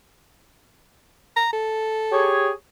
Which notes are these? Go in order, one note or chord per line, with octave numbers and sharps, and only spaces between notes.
A#5
A4
G4 G#4 C#5